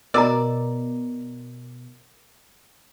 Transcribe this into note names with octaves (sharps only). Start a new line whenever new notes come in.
B2 A#4 D5 D#5 A#5